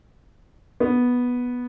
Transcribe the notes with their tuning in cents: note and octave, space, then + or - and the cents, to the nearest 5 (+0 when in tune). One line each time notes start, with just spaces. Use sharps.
B3 -5